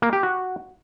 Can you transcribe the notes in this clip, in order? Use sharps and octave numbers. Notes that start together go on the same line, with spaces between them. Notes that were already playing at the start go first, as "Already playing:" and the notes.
A#3
G4
F#4